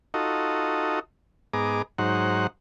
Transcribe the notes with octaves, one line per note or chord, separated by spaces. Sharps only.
D#4 F4 F#4 A4 D#5
G#2 B3 G#4 D#5 A#5 D6
G#2 F#3 D#4 C5 F#5